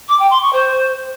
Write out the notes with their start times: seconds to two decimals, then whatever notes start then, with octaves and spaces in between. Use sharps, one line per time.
0.08 D6
0.19 G5
0.30 C6
0.41 C#6
0.52 C5